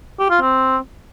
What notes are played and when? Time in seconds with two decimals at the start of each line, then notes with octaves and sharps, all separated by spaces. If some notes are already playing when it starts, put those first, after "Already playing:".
0.19 G4
0.30 F4
0.41 C4